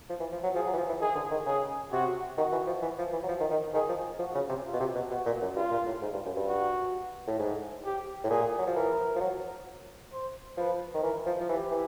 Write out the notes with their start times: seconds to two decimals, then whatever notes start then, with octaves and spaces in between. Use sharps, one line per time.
0.10 F3
0.20 E3
0.32 F3
0.43 F#3
0.55 F3 G#4
0.67 F#3
0.73 E3
0.77 F3
0.89 E3
1.01 D#3 G#4
1.15 D3
1.31 D#3
1.46 C#3 G#4
1.92 C3 F#4
2.38 D#3 F#4
2.52 E3
2.67 F3
2.82 E3
2.99 F3
3.13 E3
3.24 F#3
3.29 F3
3.40 D#3
3.51 D#3
3.73 D#3 G#4
3.89 F3
4.19 F3 F#4
4.35 C#3
4.49 C3
4.65 F4
4.73 B2
4.80 C3
4.95 B2
5.11 B2 F#4
5.26 A#2
5.42 F#2
5.56 G2 F4
5.71 A#2
5.86 A2
6.02 G#2
6.13 G2
6.25 F#2
6.36 G2
6.48 F#4
7.27 A2
7.39 G#2
7.84 G4
8.24 A2
8.30 A#2 G#4
8.58 F#3
8.67 F3
8.75 E3 A#4
9.16 F3
9.21 F#3
10.12 C5
10.57 F3 B4
10.94 D#3
11.03 E3 A#4
11.26 F3
11.40 F3
11.49 E3 G4
11.72 E3